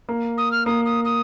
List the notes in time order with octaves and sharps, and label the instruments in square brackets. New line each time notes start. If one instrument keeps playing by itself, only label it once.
[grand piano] A#3
[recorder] D#6
F6
[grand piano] A#3 [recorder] D#6
[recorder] D#6
D#6